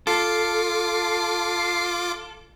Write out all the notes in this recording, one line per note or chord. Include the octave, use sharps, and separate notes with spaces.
F4 A4 D6 C7